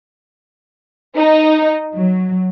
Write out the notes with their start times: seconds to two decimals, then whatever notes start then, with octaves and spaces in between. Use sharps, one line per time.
1.17 D#4
1.96 F#3